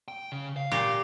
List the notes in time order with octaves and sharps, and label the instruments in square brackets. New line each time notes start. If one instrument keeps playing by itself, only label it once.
[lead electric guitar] G5
C#3
F5
[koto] A#2 G4